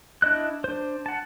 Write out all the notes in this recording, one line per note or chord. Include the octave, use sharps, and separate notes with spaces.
D4 E4 D#5 F#6
D4 C5
F#5 A5